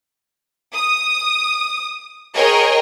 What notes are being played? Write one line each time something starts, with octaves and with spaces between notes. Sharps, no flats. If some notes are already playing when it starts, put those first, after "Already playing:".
D#6
G#4 A#4 C#5 D#5 G5